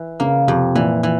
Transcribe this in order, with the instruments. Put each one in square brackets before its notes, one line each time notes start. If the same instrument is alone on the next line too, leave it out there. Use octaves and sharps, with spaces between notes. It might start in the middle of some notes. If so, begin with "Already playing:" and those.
Already playing: [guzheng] E3
[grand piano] C#3 [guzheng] A#3
[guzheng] F2 [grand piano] C3
[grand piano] A#2 [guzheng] E3
[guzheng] E3